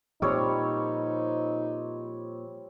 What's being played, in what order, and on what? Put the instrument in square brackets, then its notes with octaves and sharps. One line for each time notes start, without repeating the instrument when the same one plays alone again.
[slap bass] A#2 F3 [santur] G3 C4 C#5 [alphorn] D#4